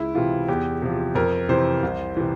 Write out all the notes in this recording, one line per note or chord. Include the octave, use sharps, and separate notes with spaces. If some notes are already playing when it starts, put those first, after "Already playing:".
Already playing: C#2 E4
C3 E3 F4
E2 G4
C3 F3
F2 A#4
C3 E3 C5
C2
C3 E3